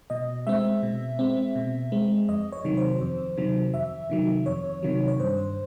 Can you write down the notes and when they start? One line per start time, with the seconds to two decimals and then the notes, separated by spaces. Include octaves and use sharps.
0.10 B2 D#5
0.47 G#3 C4 E5
0.83 B2
1.19 G#3 C4
1.56 B2
1.92 G#3 C4
2.28 F2 D#5
2.52 C#5
2.64 C3 D#3 F#3
2.77 C5
3.01 F2
3.37 C3 D#3 F#3
3.74 F2 E5
4.10 C3 D#3 F#3
4.46 F2 C#5
4.83 C3 D#3 F#3
5.08 C#5
5.20 G2 C5